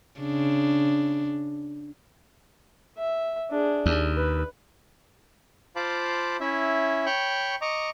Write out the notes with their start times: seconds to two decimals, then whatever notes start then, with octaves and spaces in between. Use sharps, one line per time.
0.20 C#3 D4
2.98 E5
3.51 D4 G#4
3.86 D#2
4.17 B4
5.76 F4 C5 F5 A5 B5 D6
6.40 C#4 E4 E5
7.06 C#5 G5 B5 C#6
7.61 D#5 A#5 C#6 D6